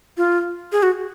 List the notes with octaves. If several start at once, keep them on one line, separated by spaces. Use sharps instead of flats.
F4
G#4
F#4